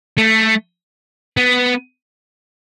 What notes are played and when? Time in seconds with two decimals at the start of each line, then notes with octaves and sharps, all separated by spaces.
0.18 A3
1.37 B3